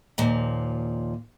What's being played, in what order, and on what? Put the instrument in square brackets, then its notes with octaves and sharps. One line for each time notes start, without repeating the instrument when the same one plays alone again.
[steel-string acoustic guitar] D#2 A#2 F3